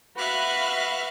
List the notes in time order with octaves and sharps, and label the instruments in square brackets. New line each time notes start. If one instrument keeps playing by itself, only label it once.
[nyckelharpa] F#4 B4 [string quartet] E5 F5 F#6 [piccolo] B5